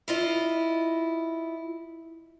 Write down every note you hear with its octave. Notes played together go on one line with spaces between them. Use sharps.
E4 F4 D#5